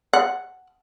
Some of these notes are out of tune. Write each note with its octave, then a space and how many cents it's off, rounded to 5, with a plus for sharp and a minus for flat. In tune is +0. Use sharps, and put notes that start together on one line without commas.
F#5 +0